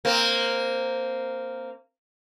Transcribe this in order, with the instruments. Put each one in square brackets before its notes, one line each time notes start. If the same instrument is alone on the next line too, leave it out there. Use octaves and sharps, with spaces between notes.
[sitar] A#3 C4